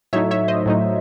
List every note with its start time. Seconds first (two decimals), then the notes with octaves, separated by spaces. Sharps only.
0.13 A2 F#3 A3 D#4 C#5 E5
0.31 C#5 E5
0.48 C5 D#5
0.66 A2 F#3 A3 D#4